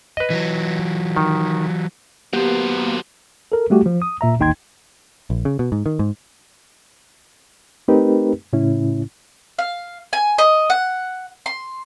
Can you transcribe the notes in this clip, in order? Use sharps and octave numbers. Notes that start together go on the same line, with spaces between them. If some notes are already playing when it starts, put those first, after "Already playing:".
B4 D#5
E3 F#3
D#3
F#3 A#3 B3 G4 C5
A4 A#4
G3 A3 F#4 G4
F3
D#6
A#2 E5 A#5
A1 D#2 D#4 G5 C6 G#6
A#1
C#3
B2
G#2
D#3
G#2
A3 C4 D#4 G4 A#4 B4
A2 C#3 C#4 E4
F5
G#5
D#5
F#5
C6